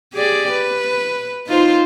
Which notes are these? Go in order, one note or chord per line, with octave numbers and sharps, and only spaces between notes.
G4 G#4 D5
B4
D#4 F4 C5